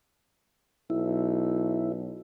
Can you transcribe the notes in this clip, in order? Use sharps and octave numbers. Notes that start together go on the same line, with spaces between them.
B1 E4